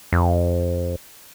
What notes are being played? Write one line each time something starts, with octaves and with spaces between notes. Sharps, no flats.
F2